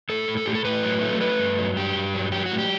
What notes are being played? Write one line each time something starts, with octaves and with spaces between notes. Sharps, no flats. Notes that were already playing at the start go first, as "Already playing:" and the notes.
A2 A4
A2
A4
A2 G4
A4
A2 B4
F#3
A3
A3 B4
G2
F#3
G2 G4
G2
F#3
F#3 G4
F#4
A2
G4